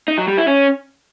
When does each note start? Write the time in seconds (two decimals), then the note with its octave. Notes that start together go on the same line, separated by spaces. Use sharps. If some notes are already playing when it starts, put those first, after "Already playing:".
0.08 D#4
0.18 F#3
0.28 G3
0.38 E4
0.48 C#4